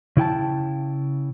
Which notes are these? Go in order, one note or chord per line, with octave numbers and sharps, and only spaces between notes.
C#3 E4 G5 A5